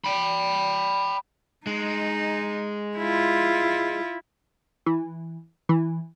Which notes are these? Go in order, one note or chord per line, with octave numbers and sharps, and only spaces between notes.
G5 B5
G#3 D#4
E4 F4
E3
E3